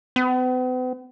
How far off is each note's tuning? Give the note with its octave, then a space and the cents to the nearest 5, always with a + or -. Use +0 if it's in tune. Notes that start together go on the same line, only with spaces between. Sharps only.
B3 +45